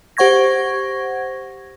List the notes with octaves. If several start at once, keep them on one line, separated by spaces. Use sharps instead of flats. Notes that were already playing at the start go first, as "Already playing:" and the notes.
G4 C5 F#5 C#6 G#6 A#6